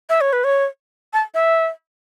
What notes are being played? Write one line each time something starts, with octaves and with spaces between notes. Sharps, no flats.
E5
C#5
B4
C#5
A5
E5